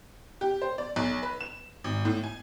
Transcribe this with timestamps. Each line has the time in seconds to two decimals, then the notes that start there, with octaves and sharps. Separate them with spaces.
0.41 G4
0.62 C5
0.78 D5
0.96 B1
1.23 B4
1.41 E7
1.84 G#1
2.05 A2
2.23 G#5